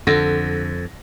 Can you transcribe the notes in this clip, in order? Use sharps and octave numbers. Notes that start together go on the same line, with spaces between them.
F2 D3 A#6